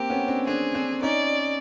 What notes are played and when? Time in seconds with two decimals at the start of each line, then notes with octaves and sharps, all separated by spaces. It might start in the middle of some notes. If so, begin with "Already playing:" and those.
Already playing: A#3 C4 G4
0.10 B3 C#4
0.28 C4 D4
0.47 C4 D4 G#4
0.75 C4 D4
1.03 C#4 D#4 D5